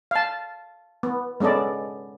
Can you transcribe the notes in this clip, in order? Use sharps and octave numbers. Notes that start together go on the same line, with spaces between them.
F5 A5
B3
G#3 B3 C#4 A4 D5